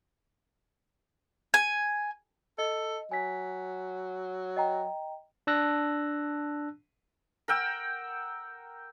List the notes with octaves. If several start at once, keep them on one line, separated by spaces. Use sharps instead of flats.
G#5
A4 D#5
F#3 G#5 B6
D#5 G5 A#5
D4 A5 E6 F#6 A#6
A#4 F#5 G5 E6